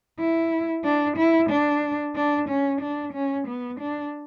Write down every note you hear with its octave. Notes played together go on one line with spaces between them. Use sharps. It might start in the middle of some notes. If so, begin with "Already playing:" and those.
E4
D4
E4
D4
D4
C#4
D4
C#4
B3
D4